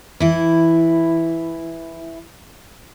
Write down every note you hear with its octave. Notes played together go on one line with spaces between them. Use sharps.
E3 E4